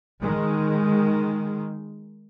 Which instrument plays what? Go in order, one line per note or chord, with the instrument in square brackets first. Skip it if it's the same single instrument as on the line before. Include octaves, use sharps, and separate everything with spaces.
[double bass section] D#3 G#3